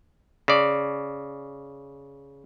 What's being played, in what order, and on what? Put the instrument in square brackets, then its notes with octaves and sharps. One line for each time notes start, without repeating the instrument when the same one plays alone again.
[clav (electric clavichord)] C#3 D5